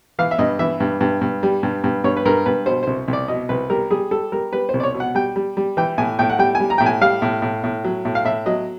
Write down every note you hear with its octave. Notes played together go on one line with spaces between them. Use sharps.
E3 F5
E5
G2 D#5
E3 E5
G2
G2
G2
G3
G2
G2
G2 C#5
B4
G2 A#4
G2 B4
B2 C5
C2 C5
C2
D5
B2 D#5
C2 B4
G3 A#4
G3 G#4
G3 A4
G3 A#4
G3 B4
C2 C5
D5
C#5
B2
F#5
G3 G5
G3
G3
E3 G5
A2 G#5
A2 G5
F#5
G3 G5
G#5
G3
A#5
A2 G5
G#5
G3 F5
A2
A2
A2
F#3
A2
F5
A2 E5
F#3 D#5